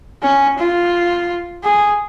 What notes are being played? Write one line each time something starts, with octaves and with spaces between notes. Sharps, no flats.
C#4
F4
G#4